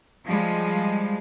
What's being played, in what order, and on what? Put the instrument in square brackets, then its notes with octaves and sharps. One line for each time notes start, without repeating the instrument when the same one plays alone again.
[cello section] F3 G3 G#3